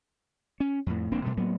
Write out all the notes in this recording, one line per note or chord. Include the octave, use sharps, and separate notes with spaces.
C#4
F2 A2
E1 A#3 C4 D4
B2 G3 A3
A2 F#3 A#3 B3